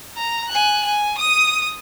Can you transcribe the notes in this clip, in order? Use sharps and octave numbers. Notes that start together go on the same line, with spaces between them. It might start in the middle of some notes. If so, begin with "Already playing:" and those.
A#5
G#5 F#6
G#5
D#6 D#7